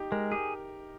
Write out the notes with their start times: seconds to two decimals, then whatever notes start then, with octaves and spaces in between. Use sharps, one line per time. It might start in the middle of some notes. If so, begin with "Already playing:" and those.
Already playing: D#4 G4
0.12 G#3 A#4
0.31 G4 G#4